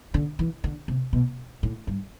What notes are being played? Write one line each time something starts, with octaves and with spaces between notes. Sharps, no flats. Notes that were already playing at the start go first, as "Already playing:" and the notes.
D3
E3
D3
C3
B2
A2
G2